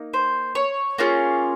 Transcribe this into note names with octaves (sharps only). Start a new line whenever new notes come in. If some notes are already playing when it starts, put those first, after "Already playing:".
Already playing: A#3 D#4
C5
C#5
A#3 C#4 F4 G#4